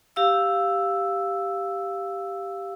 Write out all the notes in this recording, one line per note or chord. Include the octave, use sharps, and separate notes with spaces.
G4 F5 E6